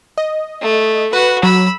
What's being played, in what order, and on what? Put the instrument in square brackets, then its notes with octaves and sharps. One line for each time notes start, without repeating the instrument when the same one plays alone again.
[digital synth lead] D#5
[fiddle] A3
[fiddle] F#4 [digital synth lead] B4
[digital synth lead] F#3 [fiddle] B5 E6